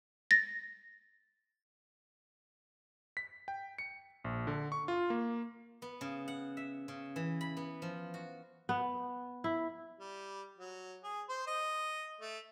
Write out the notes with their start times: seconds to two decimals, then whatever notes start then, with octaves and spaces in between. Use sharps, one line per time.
0.31 A6 A#6
3.17 B6
3.48 G5
3.78 C#7
4.24 A#1
4.47 D3
4.72 C#6
4.88 F4
5.10 A#3
5.82 B3
6.01 C#3
6.28 F#5
6.57 E5
6.88 C#3
7.16 E3
7.41 B5
7.57 B3
7.82 F3
8.14 F#4
8.69 B3
9.44 E4
10.00 G3
10.58 F#3
11.04 G#4
11.29 C5
11.47 D#5
12.21 A3